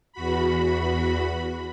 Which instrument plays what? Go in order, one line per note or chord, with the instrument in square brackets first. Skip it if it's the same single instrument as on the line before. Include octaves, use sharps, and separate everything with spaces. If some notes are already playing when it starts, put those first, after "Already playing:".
[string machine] E2 F#4 B5